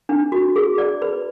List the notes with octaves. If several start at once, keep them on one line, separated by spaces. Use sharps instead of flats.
D4
F#4
G#4
D5
B4